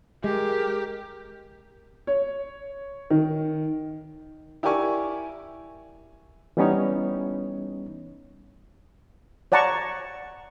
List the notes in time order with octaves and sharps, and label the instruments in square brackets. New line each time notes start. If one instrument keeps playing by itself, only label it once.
[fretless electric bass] G#3 [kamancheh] G4 A#4
[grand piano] C#5
D#3
[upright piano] E4 G4 A#4 D5 G#5 C#6
[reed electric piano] E3 G3 B3 C#4 D#4 C#5
[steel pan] C#5 D5 F#5 A5 A#5 C#6